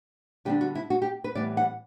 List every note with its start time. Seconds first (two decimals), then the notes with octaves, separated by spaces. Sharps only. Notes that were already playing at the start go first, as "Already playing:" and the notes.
0.45 D3 G3 B3 D4 G4
0.61 F#4
0.75 E4
0.90 F#4
1.02 G4
1.24 B4
1.35 A2 E3 G3 B3 D5
1.57 F#5